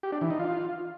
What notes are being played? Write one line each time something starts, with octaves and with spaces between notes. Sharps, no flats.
G4
D4
E3
D#4
F4